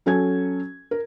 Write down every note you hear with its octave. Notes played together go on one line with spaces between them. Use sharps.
F#3 C#4 A4 G#5 G#6
A#4